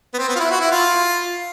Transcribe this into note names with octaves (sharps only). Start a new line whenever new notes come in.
B3
C4
B3
F4
E4
F#4
E4
F4